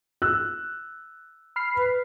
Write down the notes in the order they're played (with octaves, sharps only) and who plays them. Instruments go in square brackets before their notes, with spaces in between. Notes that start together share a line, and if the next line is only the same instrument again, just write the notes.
[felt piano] E6 F#6
[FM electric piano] B5 F6 C7
[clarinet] B4